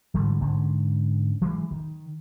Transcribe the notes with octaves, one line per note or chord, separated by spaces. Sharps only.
G#2 D3 E3 G3
G#2 D3 C#4
E3 F#3 G#3
D#3